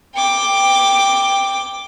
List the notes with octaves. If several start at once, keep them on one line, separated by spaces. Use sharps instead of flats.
G5 D6